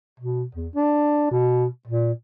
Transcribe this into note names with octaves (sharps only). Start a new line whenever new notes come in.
B2
E2
D4
B2
A#2